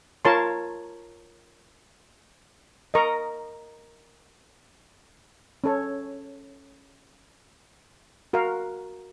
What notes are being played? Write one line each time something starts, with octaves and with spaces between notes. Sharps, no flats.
F4 A#4 C#5 A5 C6
A#4 D#5 A#5 C#6
C#4 A4 C#5
F#4 A#4 F5